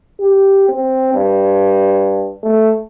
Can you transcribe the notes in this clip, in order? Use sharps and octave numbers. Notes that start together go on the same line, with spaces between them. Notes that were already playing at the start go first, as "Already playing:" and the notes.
G4
C4
G2
A3